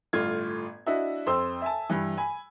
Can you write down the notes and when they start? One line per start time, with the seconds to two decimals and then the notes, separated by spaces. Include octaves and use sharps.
0.13 G1 A2 F4 G#6
0.86 D4 E4 F#4 D#5 E5
1.26 F2 C5 C6 E6
1.62 E5 G#5 A5
1.89 G2 E3
2.18 G#5 B5